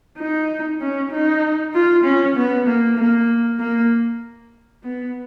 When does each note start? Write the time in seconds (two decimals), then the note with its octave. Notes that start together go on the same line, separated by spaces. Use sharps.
0.18 D#4
0.80 C#4
1.11 D#4
1.74 F4
2.04 C#4
2.36 B3
2.67 A#3
2.97 A#3
3.59 A#3
4.83 B3